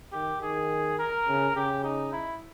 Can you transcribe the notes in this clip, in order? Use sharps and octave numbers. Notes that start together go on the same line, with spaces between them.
D#3 G4
D#3 G#4
A#4
C#3
C#3 G4
D#4
E4